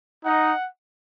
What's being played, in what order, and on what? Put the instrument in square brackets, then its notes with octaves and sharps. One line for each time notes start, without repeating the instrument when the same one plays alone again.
[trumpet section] D#4 [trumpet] F#5